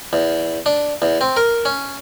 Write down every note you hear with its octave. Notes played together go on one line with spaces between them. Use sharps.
E2
D4
E2
C4
A#4
C#4